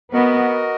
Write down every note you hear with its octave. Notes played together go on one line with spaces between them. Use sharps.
B3 F#4 A#4 D#5